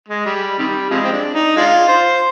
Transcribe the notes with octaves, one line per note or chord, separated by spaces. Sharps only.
G#3
G3
C3 D#3 G3
C3 F3 G#3
C4
D4
D#4
G#3 D4 F4
C5